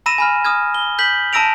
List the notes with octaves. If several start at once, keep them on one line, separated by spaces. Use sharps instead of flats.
A#5 B5 E6 A#6 D#7 E7
G#5 B5 F6
D#6 F6 G#6
G7
G6 B6 F#7
A5 A#5 E6 A#6 D7 F7